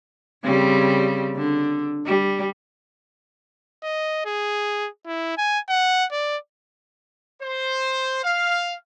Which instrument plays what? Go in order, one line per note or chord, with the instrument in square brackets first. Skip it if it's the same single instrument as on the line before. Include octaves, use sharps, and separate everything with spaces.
[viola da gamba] C#3 G3 C4
D3
G3
[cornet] D#5
G#4
E4
G#5
F#5
D5
[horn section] C5
F5